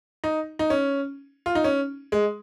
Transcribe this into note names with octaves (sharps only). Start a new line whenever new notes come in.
D#4
D#4
C#4
F4
D#4
C#4
G#3